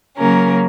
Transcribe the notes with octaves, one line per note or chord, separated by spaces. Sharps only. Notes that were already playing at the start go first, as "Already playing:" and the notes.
C#3 F#3 A#3 C#4 A#4